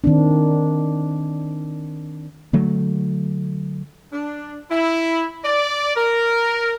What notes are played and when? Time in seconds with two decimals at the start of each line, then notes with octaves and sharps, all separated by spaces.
0.04 D#3 C4 D4
2.53 D3 F#3 A3
4.13 D4
4.71 E4
5.45 D5
5.96 A#4